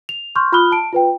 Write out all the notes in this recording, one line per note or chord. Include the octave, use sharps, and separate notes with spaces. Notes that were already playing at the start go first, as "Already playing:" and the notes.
F7
C6 C#6 F6 G6
F4 B5 D#6 F6 F#6 G7
A5 D7
F4 B4 G5